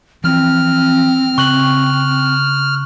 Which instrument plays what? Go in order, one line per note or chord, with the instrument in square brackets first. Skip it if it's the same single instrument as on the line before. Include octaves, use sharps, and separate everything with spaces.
[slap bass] E3 F3 [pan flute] C4 [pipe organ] F6
[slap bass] C#3 [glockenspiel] C#6 F#6 F#7